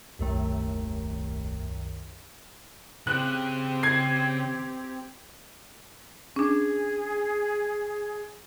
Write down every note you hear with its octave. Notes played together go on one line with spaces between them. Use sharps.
D#1 C2 F#2 D#3 A3
C#3 C4 G4 F#6
G#6 C7
C#4 D4 G#4